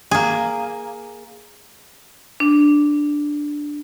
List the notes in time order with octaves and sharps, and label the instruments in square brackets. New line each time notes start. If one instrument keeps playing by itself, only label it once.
[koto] A#3 G#4
[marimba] D4